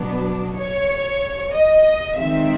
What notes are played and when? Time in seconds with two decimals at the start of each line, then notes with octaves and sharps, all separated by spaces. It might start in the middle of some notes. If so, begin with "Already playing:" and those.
Already playing: B2 F#3 B3 D4
0.56 C#5
1.52 D#5
2.17 D#3 G#3 C4 E5